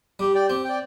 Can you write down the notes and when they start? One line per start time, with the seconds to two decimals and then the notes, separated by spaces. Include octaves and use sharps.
0.19 G3 G4
0.35 D5 G5
0.50 C4 G4
0.64 D5 G5